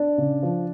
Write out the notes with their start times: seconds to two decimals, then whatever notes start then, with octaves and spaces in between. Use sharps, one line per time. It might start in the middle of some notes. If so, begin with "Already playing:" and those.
Already playing: D4 D5
0.18 C#3
0.43 F3